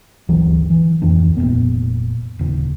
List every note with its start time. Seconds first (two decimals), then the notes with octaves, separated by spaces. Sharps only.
0.28 G1 D2 E3 F#3
0.70 E3
1.02 D1 F2 E3 D4
1.37 F1 F2 A#2 B3
2.39 D#1 C#3